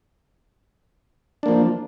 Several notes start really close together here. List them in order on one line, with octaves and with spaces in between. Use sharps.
D4 A#3 F3